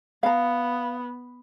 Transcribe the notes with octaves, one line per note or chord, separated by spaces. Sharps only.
B3 F5 A#5